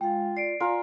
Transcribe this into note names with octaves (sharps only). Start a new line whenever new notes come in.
G#3 F4 F5 G5
D5 C7 D7
F4 A#4 D5 G#5